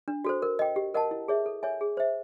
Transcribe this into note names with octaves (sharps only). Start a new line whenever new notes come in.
D4
F#4 A4 C5
A#4
D#5 G5
G4
A#4 D#5 F#5 A5
E4
G#4 C#5 E5
A4
C#5 E5 G#5
G#4
C5 E5